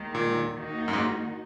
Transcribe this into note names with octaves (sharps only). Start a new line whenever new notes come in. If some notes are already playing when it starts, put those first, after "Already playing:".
Already playing: D#2 D#3 G#3
A#2
D#2 D#3 A#3 D#4 F#4
F#2
G#2